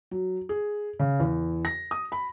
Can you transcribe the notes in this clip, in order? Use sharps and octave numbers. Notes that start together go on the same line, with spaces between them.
F#3
G#4
C#3
E2
A#6
D#6
B5